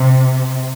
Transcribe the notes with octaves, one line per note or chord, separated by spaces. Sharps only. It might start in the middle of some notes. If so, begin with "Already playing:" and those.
Already playing: C3